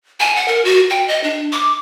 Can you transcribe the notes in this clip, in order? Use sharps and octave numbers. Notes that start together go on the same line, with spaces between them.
G#5
F#5
A#4
F#4
G5
D#5
D4
D6